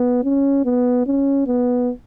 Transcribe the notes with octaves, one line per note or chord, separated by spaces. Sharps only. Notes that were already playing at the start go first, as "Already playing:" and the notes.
Already playing: B3
C#4
B3
C#4
B3